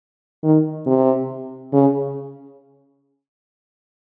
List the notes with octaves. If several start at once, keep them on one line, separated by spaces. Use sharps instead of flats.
D#3
C3
C#3